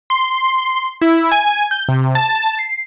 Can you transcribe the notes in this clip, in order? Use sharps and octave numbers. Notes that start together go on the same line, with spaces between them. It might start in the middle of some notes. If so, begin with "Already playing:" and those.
C6
E4
G#5
G6
C3
A5
C7